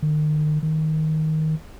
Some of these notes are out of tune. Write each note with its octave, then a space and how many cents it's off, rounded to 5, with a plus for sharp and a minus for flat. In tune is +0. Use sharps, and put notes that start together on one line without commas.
D#3 -40
D#3 +10